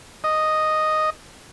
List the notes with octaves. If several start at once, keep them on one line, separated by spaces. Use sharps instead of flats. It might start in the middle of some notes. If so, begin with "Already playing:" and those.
D#5